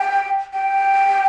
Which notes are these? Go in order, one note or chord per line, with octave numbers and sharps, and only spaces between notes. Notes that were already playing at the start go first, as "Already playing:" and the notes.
Already playing: G5
G5